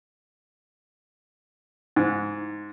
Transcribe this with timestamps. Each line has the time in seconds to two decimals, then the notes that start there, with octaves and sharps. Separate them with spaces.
1.96 G#2